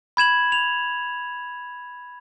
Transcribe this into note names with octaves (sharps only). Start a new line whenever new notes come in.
B5 G#6 E7 F#7
F7